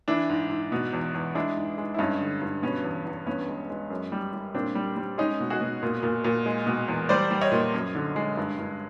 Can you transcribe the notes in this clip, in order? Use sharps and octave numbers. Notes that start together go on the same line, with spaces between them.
E3 D4 E4
G#2
G#2
B2
E2
E2
G#3 D4 E4
G#2
G#3
E4
G2 C#4 D#4
D3
G2
B2 B3 C#4
E2
E2
G2 B3 C#4
G#3
G#3
F#2
G3
G3
A#2 C4 D4
G3
G3
G#3 C#4 D#4
B2
F#4 G#4
B2
A#2
A#2
A#2
G#3
B2
E2
G3 C5 D5
G3
C#5 D#5
A#2
F#2
D3
G#3
G2
G2